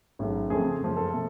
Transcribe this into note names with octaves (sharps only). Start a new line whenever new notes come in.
A1 G#2 F#3 A3
F2 C#3 F3 A3 G#4
F#2 F3 G#3
A4
B2 A3